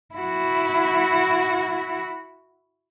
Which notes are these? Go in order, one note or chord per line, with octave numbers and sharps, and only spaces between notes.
E4 F#4